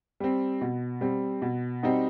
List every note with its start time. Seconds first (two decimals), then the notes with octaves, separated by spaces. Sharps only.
0.20 G3 C4
0.61 B2
1.01 G3 C4
1.42 B2
1.83 G3 C4 D#4 F#4